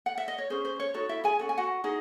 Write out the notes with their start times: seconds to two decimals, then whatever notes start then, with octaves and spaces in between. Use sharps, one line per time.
0.06 F#5
0.18 E5
0.28 D#5
0.38 C#5
0.50 C#4 G#4 C5
0.65 C5
0.80 C#5
0.94 D#4 F#4 A4 C#5
1.09 E4 E5
1.24 G#4 G#5
1.39 C#4 F#4 A4 F#5
1.49 G#5
1.58 F#4 F#5
1.84 D#4 E4 G#4 D#5